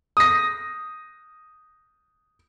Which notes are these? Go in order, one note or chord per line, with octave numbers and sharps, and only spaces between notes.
D#6 A#6